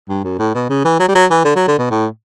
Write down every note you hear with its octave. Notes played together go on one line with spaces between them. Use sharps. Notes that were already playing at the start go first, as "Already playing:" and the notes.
G2
F#2
A2
B2
C#3
E3
F#3
G3
F#3
E3
D3
F#3
D3
B2
A2